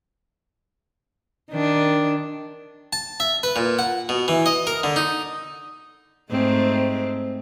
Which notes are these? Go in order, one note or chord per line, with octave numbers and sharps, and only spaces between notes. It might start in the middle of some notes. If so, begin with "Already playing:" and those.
D#3 D4
A5
E5
B4
A#2
F#5
B2
E3
D#5
A#4
D3
D#4
G#2 A3 C4